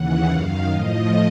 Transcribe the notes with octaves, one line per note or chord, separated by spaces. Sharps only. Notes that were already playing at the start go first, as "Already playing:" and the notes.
Already playing: D#2 C#3 E3 F#5
F#2 D#3 F5
A2 F3 D#5